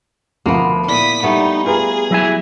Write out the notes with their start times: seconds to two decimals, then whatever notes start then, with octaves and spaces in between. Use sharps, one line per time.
0.46 D2 F3 A#3 B3
0.89 A#2 E4 D5 D#6 B6
1.23 G3 A3 B3 D#4
1.66 F4 G#4 B4 A#5
2.11 F#3 E4 G#5